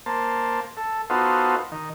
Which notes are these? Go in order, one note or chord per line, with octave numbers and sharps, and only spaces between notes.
A#3 C5 A5
A4
B3 D#4 F4 F#4 A4 C5
D#3